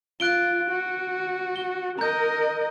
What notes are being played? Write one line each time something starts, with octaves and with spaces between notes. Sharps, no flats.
F4 F#6 D7 G7
F#4
G7
A#4 D#5 A#5 G6